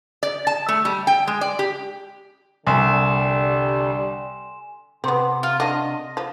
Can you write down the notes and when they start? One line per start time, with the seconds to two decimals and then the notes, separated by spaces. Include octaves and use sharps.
0.23 D5
0.47 A5
0.68 A3
0.85 G3
1.07 G5
1.27 G#3
1.41 D5
1.59 G4
2.67 C2 D3 G3 G#5 C6 E7
5.04 C3 B3 C4
5.43 F4
5.60 D4 F#4 D#5
6.17 F3